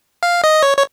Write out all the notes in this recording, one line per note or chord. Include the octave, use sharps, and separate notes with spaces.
F5
D#5
C#5
C#5